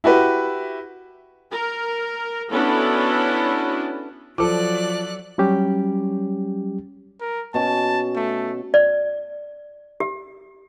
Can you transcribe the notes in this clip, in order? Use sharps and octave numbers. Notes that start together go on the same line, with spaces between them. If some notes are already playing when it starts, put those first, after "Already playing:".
E4 F#4 G4 B4
A#4
B3 C#4 D4 E4 F#4 A4
F3 F#3 A4 D5 D6 F#6
F#3 G3 C#4 G4
A#4
B2 C#4 A5
A3
D5
G4